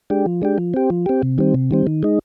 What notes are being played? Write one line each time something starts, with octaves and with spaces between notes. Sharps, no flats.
G#3 D4 G4
F3
G#3 D4 G4
F3
C4 G4
F3
C4 G4
C3
D#3 G3 C4
C3
D#3 G3 C4
D#3
G#3 D#4